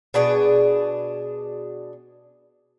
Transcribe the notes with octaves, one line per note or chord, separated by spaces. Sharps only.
B2 D4 G#4